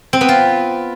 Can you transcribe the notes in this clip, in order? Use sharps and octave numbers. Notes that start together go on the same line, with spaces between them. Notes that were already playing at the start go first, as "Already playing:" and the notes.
C4
B3
F4